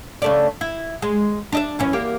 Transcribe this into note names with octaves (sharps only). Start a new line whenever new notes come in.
C#3 A3 D5
E4
G#3
D4 D#5 E5
F#2 E3 C#4
E2 A#3 G4